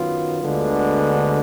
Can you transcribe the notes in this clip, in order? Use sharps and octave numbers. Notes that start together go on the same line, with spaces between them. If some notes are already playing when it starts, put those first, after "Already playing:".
Already playing: F#2 D#3 F#3 B3 F4
D2 D3 G#3 B3